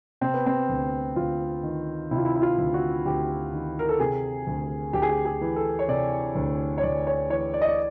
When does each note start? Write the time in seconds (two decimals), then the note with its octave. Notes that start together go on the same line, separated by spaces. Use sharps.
0.21 C3 C4
0.34 B3
0.46 C4
0.69 D2
1.16 D2 F4
1.63 D#3
2.11 C3 E4
2.18 F4
2.25 E4
2.36 E4
2.42 F4
2.58 D2
2.74 F#4
3.06 D2 G4
3.53 D#3
3.79 A#4
3.89 A4
4.00 C3 G#4
4.47 D2
4.93 D2 G4
5.02 G#4
5.09 G4
5.25 G#4
5.41 E3
5.56 A4
5.79 C#5
5.88 C3 D5
6.35 D2
6.78 C#5
6.83 D2 D5
7.07 C#5
7.30 E3 C#5
7.54 D5
7.61 D#5
7.69 D5